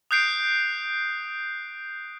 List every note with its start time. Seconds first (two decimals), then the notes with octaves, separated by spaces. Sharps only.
0.11 D#6 F#6 G6 C7 D7